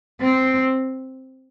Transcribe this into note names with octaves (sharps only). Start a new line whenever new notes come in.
C4